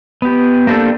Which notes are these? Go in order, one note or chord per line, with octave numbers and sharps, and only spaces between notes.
B3 G4
A#3 C4 D4 G4 A4